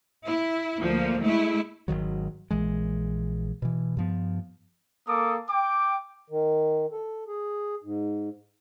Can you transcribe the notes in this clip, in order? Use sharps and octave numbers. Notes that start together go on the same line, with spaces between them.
E4
D2 F3 A#3
G#3 A3 E4
G#1 C#2 D#3 F#3
A#1 E3 G#3
B2 E3
G2 F3 B3
A#3 A4 D6 D#6
G5 D6
D#3
A4
G#4
G#2